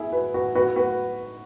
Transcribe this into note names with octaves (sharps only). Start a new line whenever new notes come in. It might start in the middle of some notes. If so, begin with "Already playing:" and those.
Already playing: B3 E4 G#4
F#4 B4
F#4 B4
F#4 B4
F#4 B4